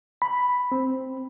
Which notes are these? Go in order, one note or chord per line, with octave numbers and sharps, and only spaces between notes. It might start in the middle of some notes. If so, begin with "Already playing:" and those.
B5
C4